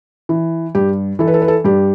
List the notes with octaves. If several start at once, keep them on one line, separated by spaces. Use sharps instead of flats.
E3
G2 G4
E3 A4
B4
A4
B4
A4
G2 G4